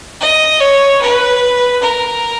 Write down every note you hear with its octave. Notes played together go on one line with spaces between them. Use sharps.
D#5
C#5
B4
A#4